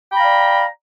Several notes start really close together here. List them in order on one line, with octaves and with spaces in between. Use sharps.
G5 B5 A#5 F5 D5